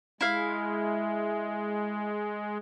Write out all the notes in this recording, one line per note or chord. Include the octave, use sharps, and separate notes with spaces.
G#3 E4 F5